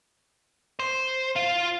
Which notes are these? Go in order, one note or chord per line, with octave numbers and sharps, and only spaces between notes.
C5
F4 F5